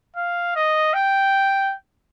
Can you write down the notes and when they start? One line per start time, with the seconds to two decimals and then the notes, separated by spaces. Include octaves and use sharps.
0.16 F5
0.56 D#5
0.94 G5